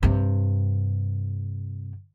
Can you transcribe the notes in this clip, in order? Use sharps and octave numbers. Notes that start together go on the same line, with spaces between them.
G2 C3